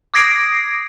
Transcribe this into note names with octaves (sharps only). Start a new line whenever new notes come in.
D6 D#6 G#6 A#6 C7 D7